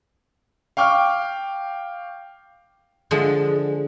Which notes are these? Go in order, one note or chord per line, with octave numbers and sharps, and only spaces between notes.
F5 G5 C#6 D6 F6
D3 F3 G#3